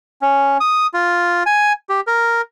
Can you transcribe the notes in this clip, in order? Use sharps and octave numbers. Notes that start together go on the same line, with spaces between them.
C#4
D#6
F4
G#5
G4
A#4